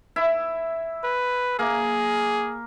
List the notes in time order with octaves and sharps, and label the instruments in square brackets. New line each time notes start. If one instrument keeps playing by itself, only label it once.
[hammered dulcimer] E4
[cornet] B4
[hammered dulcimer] A#3 [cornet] G#4